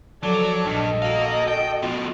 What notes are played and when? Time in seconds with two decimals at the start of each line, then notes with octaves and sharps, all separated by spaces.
0.24 F3 F#3 A4 D5
0.67 A#1 G2 A4 D#5
1.02 F#4 A#4 F5
1.48 G5
1.83 B2 F3